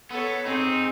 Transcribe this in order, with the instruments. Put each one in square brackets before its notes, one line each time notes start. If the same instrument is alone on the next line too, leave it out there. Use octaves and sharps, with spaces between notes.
[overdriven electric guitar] B3 [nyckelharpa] A4 C#5
[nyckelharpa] C4 [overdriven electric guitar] D#4 G#4